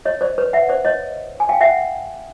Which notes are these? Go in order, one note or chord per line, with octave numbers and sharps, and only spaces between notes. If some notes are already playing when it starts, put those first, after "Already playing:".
C#5 D#5
C5 D5
B4 C#5
E5 F#5
C5 D5
C#5 D#5
G#5
F5 G5
E5 F#5